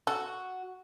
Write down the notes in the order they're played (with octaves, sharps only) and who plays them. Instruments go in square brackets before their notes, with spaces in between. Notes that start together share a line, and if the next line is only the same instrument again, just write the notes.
[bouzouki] F#4 [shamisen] A4